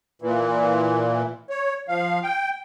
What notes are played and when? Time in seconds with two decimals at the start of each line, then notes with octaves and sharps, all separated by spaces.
0.22 A#2 E3
1.50 C#5
1.88 F3 F5
2.23 G5